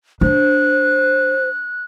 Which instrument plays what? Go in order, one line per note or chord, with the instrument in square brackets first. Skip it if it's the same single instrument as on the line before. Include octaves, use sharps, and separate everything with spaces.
[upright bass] D4 [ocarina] C5 [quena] F#6